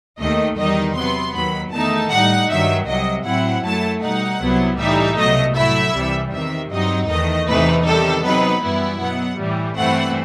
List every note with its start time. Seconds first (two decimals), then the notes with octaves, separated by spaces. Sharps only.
0.19 D#2 D#3 A3 D#5
0.58 E2 D#3 G3 D#4 D#5
0.96 C3 F#3 B3 C6
1.34 D#2 D#3 F#3 B5
1.72 E2 D#3 A3 D#4 A5
2.11 A2 G3 D#4 F#5
2.49 G2 D#3 F#3 E5
2.87 C2 C3 F#3 D#5
3.26 A2 F#3 C4 E4 F#5
3.64 F#2 F#3 A3 E4 A5
4.02 B2 G3 D#4 F#5
4.41 C2 C3 F#3 B3 E4
4.79 A2 E3 G3 D#4 E5
5.17 C2 B2 F#3 A3 D#5
5.55 A2 F#3 A3 E4 E5
5.94 C2 C3 E3 G3
6.32 E2 C3 D#3 E5
6.71 G2 F#3 C4 D#4 D#5
7.09 E2 D#3 A3 D#5
7.47 E2 C3 E3 A3 D#4 B4
7.85 C3 D#3 G3 A4
8.24 C3 F#3 B3 D#4 B4
8.62 F#2 E3 G3 B3 E4
9.00 B2 F#3 B3 F#5
9.39 A2 E3 G3
9.77 G2 E3 A3 C4 E4 F#5